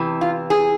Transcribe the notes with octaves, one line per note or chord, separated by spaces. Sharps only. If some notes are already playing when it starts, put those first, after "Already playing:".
Already playing: E2 C3 E3
F4
G#4